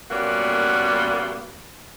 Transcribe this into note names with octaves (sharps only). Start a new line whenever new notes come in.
A#2 G3 A#3 B3 C#4 F#4